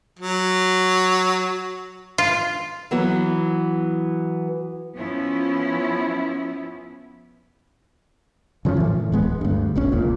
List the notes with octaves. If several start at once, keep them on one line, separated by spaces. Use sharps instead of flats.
F#3
F4
E3 F#3 B3 B4
F3 B3 C#4 E4
C#3 F3 A#3 C#4
A2 E3
D1 G#3 B3
D2 G2
E1 A#1 C#4
E1 C#2 A#2